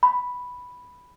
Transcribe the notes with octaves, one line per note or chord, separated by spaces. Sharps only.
B5